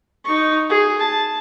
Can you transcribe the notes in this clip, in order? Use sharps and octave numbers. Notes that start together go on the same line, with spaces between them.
D#4 C#6
G#4
A5